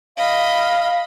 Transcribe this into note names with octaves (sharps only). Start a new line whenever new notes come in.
D#5 F5 B5